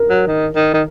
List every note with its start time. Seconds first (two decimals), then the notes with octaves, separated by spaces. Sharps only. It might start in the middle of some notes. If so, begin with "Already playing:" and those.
Already playing: A#4
0.10 F#3
0.27 D#3
0.56 D#3
0.74 D#3